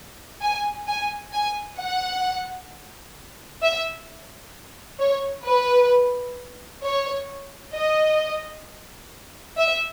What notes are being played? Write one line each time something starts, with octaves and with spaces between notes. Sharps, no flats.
G#5
G#5
G#5
F#5
E5
C#5
B4
C#5
D#5
E5